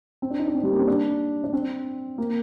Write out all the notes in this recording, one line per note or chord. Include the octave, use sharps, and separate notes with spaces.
C4
D4
D#4
D4
C4
G3
A#3
C4
D4
D4
C4
A#3